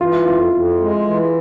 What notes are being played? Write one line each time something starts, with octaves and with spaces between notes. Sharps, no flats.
E3 F4
E4
F2 F4
F2
G#3
E3